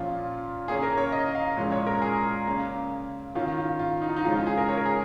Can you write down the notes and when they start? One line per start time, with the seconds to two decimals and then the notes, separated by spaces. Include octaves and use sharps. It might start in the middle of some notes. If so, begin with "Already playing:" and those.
Already playing: A#2 F3 C#4 F4
0.68 C#3 A#3 C#4 G#4
0.83 A#4
0.97 C#5
1.12 D#5
1.35 F5
1.57 A#2 F3 G#3 C#4
1.72 C#5
1.87 A#4
2.02 G#4
2.46 C#3 A#3 C#4
3.35 D#3 C#4 F4
3.58 F4
3.79 F4
4.02 D#4
4.09 F4
4.16 D#4
4.24 C#3 F3 G#3 C#4 F4
4.35 F4
4.47 G#4
4.58 A#4
4.69 C#5
4.78 A#4
4.86 G#4